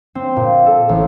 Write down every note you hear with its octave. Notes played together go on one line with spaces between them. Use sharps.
C4
A#2
A4
A1